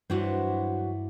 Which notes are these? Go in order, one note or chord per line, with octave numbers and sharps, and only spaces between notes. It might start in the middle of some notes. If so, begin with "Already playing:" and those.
G2 E3 F#3 D4 F#4 C5 F#5